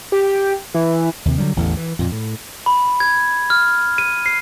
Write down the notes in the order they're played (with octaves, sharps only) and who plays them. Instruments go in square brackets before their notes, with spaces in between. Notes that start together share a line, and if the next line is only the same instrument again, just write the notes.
[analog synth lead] G4
E3
[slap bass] D#2 C3
D3 F#3 G3
A1 E2 A2 D3
E3
F2 A#2
A2
[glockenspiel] B5
G#6
F6
D#7
C7